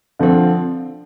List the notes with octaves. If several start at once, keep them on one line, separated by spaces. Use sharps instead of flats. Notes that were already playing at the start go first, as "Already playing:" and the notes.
D3 F3 C4